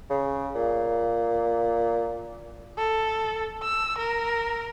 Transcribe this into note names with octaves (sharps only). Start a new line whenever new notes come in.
C#3
A#2
A4
E6
A#4